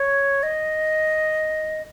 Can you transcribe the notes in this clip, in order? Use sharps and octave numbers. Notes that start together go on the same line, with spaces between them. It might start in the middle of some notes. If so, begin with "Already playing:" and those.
Already playing: C#5
D#5